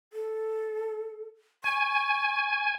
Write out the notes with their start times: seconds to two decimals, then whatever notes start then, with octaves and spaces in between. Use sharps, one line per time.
0.13 A4
1.64 G#5 C#6